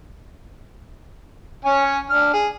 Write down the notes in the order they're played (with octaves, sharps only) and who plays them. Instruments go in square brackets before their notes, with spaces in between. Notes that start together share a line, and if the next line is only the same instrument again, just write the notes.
[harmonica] C#4 C#5 G#5
D4 F6
G#4